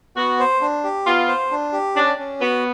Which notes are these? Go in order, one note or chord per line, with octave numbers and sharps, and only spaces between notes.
B3 F#4
C5
D4
G4
B3 F4
C5
D4
G4
C#4 D4
C#4
B3 F#4